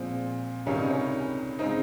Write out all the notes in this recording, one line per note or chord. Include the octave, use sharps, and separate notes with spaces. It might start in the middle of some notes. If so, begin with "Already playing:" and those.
Already playing: A#2 F3 G#3 C4
C#2 C3 D#3 G3 C#4
D#4
C#4
C#3 G#3 C4 D#4